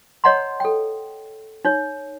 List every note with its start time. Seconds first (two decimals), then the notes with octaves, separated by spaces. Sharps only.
0.24 C#5 D#5 F#5 A#5 C6
0.60 A4 G5
1.65 D#4 C#5